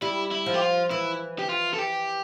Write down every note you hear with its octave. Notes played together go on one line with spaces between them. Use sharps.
G3 E4
E4
F3
G4
F4
E3 E4
G4
F4
A4
G4